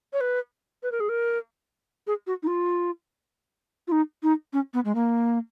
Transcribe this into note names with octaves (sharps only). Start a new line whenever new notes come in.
C#5
B4
B4
A#4
G#4
A#4
G#4
F#4
D#4
F4
F4
D#4
D#4
C#4
B3
G#3
A#3